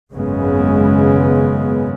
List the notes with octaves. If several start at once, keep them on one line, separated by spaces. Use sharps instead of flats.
G#1 F#2 C#3 G#3 B3